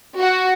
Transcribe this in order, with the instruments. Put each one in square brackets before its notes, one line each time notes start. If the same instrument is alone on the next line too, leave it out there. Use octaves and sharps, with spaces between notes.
[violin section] F#4